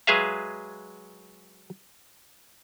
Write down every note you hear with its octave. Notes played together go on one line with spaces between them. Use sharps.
F#3 G#3 G#4 B4 E5 F5